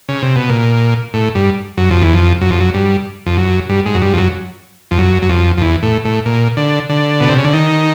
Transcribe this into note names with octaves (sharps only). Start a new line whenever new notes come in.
C#3
C3
B2
A#2
A2
G2
F#2
F2
E2
F2
F#2
F2
F#2
G2
F2
F#2
G2
G#2
F#2
G2
F2
F#2
F2
F#2
F#2
F2
F2
E2
A2
A2
A#2
D3
D3
B2
C3
C#3
D3
D#3